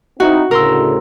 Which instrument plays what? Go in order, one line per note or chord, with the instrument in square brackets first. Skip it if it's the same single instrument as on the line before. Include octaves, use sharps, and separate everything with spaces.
[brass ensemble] C4 D#4 E4 [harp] F#4
[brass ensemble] D2 A2 C#3 [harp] A#4 C6 E6